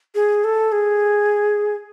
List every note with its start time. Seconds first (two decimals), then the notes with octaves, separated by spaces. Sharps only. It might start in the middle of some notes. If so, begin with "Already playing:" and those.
0.15 G#4
0.44 A4
0.72 G#4